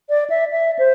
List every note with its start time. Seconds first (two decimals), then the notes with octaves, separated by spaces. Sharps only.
0.10 D5
0.30 E5
0.51 E5
0.79 C5